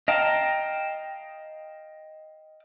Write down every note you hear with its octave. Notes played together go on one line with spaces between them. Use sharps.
D#5 F5 G5 A5 A#5